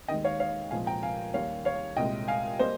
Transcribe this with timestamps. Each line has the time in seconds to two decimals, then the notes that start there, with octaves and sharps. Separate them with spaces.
0.08 D#2 D#3 G#3 D#5 G5
0.24 C#5 F5
0.40 C#5 F5
0.71 C2 A#2 F3 G#3 F5 G#5
0.86 G5 A#5
1.03 F5 G#5
1.34 D#2 D#3 G3 A#3 C#5 F5
1.65 C#5 F5
1.97 C2 A#2 G#3 D#5 G5
2.28 F5 G#5
2.59 G3 A#3 C5 D#5